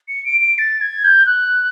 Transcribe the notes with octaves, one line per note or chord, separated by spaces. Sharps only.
C#7
D7
D7
A6
G#6
G6
F#6